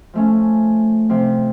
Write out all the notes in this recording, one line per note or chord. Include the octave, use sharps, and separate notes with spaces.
F3 A3 C#4
C3 F3 C4